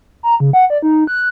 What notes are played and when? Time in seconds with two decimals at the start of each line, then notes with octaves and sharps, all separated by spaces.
0.23 A#5
0.40 C#3
0.53 F#5
0.70 D5
0.82 D#4
1.07 F#6